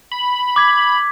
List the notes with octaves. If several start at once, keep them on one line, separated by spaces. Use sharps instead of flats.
B5
D6 G#6 B6